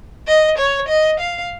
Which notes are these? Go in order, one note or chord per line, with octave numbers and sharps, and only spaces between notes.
D#5
C#5
D#5
F5